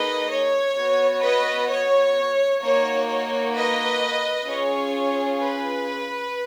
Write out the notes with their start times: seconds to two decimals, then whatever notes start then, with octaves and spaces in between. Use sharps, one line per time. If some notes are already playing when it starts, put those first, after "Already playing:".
Already playing: A#3 D#4 G#4 B4 D#5
0.30 C#5
0.76 B3 F#4
1.22 B4 D#5
1.69 C#5
2.61 A#3 D#4 F#4 C#5
3.08 C#5
3.54 B4 D#5
4.46 C#4 F4 G#4 C#5
5.39 B4